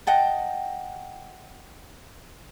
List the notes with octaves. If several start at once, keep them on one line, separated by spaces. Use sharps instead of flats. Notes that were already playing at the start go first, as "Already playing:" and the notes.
D#5 F#5 G5 A5